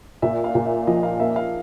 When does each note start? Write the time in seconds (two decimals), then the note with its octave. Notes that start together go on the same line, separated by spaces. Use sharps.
0.22 A#2 E5
0.44 F5
0.55 A#2
0.66 E5
0.87 F3 D#5
1.03 F5
1.20 A#3 E5
1.36 F5